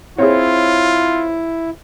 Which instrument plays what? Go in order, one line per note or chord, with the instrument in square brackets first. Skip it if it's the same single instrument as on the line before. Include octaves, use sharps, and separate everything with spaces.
[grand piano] C4 [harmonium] E4 [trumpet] F4 [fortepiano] G#4 C#5